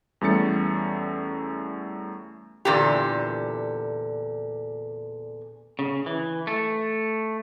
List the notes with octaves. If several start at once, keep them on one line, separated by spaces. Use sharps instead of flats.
E2 G3 A3 C#4 A6 C#7
E2 A#2 D3 G4
C#3
E3
A3